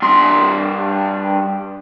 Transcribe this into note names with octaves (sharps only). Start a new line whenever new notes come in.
G2 C6